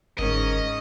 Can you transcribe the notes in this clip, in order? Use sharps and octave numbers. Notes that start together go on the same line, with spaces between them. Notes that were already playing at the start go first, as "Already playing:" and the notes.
G1 G#2 C#4 A#4 D#5